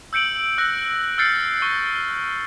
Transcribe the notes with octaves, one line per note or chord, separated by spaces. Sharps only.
E6 G6 C#7 D7 F#7
E6 F#6 A#6
E6 F6 G6 A6 C7 C#7
C#6 G7